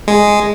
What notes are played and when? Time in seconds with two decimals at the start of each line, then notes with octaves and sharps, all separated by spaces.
0.08 G#3